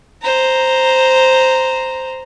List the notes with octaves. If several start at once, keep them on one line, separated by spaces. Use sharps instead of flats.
C5 A#5